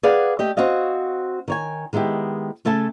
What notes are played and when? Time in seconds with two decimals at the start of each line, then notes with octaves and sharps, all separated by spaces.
0.03 G#4 B4 D5 F5 F#5
0.39 A3 G4 D#5
0.57 C4 F#4 C#5 D#5 F5
1.48 D#3 C#5 G#5
1.93 D#3 G#3 B3 E4 G4
2.65 C#3 A3 A4 G#5 A5